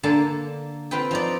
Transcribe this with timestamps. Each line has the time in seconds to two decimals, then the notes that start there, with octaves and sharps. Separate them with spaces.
0.03 D3 A#3 A5
0.91 C4 F4 B4 G5
1.11 F3 D#4 D5